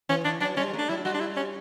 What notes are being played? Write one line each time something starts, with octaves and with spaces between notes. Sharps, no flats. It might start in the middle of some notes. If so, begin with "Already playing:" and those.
E3 C#4
E3 D4
F#3 D4
G3 C#4
A3
D4
F#3 E4
G3 F#4
D4
E4
C#4